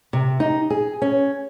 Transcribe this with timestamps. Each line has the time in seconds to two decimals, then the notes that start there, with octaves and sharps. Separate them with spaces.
0.13 C3
0.40 D#4
0.70 G#4
1.02 C#4